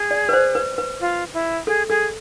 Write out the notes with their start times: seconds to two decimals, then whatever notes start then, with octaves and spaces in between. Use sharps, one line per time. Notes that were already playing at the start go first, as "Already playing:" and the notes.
Already playing: G#4
0.11 D5
0.29 B4
0.33 C5
0.55 B4
0.78 B4
1.01 F4
1.34 E4
1.67 G#4 A4
1.89 G#4 A4